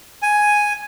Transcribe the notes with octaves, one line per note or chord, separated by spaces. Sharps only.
G#5